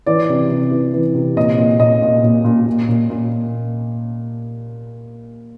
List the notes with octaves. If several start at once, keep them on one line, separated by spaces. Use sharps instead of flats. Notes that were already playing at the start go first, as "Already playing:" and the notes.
E3 D5
C3
C3
E3
E3
C3
A#2 D#5
A#2
A#2 D#5
A#2
A#2
A#2
A#2
A#2
A#2